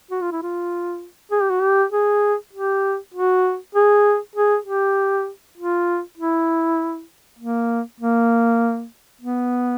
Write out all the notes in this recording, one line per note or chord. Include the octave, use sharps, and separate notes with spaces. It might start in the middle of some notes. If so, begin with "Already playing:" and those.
F#4
F4
E4
F4
G#4
G4
F#4
G4
G#4
G4
F#4
G#4
G#4
G4
F4
E4
A#3
A#3
B3